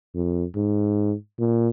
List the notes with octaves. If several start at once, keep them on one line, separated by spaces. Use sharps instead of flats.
F2
G#2
A#2